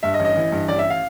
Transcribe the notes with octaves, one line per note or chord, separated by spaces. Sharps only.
G2 E5
D#5
A1
D#5
E3
G2
A1 D5
E5
F5